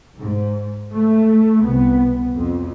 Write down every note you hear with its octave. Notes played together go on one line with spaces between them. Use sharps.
G#2
A3
C2 B3
F2